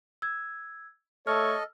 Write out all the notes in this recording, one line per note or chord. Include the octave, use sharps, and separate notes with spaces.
E6 G#6
A3 A4 C#5 D#5 E6 F6